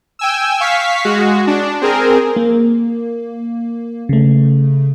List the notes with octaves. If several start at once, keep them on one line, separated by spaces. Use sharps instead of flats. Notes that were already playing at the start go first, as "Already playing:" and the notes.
G5 G#5 E6
F5 C#6 B6
G#3 F#4
D4
C4 G#4 A#4
A#3
C#3 A3